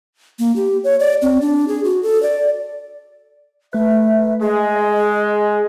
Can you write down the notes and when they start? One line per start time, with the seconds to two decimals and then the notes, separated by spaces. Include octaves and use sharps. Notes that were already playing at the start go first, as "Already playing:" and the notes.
0.39 A#3
0.56 G4
0.84 C#5
1.00 D5
1.22 C4
1.41 D4
1.68 G#4
1.84 F#4
2.03 A4
2.23 D5
3.73 A3 B4 E5
4.41 G#3 G#4
4.76 D#5